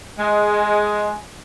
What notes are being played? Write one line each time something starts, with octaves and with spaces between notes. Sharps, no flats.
G#3